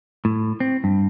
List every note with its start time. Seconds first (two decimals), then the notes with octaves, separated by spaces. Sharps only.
0.25 A2
0.60 C4
0.84 G2